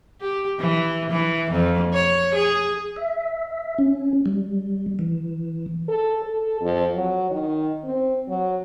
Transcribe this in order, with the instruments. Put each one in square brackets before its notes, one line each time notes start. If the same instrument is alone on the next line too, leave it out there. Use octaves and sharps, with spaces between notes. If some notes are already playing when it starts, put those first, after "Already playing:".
[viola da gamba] G4
E3
E3
F2
C#5
G#4
[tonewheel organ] E5
C#4
G3
E3
[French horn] A4
A4
F2
F#3
D#3
C4
F#3